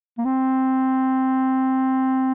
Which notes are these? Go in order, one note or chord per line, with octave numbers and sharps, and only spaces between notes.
A#3
C4